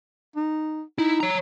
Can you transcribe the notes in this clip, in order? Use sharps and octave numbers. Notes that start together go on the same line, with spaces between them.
D#4
D#4 E4
C#5 A#5